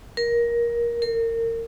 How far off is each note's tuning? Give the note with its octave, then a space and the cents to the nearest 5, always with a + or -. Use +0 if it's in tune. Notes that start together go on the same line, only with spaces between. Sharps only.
A#4 +15
A#4 -30